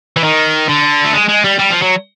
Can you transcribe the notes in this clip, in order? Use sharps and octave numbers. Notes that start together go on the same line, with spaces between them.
E3
D#3
D3
A3
G#3
G#3
G3
G3
F3
F#3